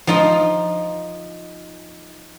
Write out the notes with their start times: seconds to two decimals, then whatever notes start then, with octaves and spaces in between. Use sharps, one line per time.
0.07 F3 D#4 F4